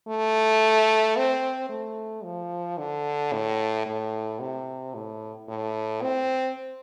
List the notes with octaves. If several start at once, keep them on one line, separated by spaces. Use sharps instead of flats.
A3
C4
A3
F3
D3
A2
A2
C3
A2
A2
C4